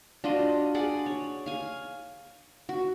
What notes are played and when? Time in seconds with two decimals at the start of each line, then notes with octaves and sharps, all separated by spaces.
0.24 D4 F4 F#4 D#5
0.75 G#4 D5 F#5
1.06 C#5
1.46 F5 G#5
2.69 F#4